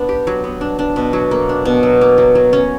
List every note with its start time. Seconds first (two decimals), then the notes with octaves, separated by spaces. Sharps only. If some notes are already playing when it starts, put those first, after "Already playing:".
Already playing: B3 D4
0.09 G4
0.27 F#3
0.44 B3
0.61 D4
0.79 D4
0.96 B2
1.13 F#3
1.31 A#3
1.49 D4
1.65 B2
1.83 F#3
2.01 A#3
2.18 F#3
2.35 F#3
2.53 C#4